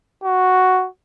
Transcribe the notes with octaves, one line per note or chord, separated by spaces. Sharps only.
F#4